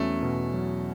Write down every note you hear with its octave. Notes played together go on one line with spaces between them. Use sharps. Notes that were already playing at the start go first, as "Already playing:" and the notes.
Already playing: E2 F#3 A3 C#4
B2
F#3